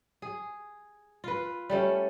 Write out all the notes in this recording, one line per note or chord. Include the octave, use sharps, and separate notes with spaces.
G#4
F4 B4
G3 A3 C#4